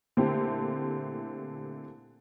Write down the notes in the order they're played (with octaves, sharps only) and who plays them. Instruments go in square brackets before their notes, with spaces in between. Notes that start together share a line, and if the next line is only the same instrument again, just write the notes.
[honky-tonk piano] A#2 D3 A3 C4 E4 G4